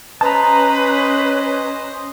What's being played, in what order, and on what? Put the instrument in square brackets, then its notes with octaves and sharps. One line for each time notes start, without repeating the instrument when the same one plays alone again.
[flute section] C#4 [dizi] B4 [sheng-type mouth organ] C5 D#5 [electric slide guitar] A5 A#5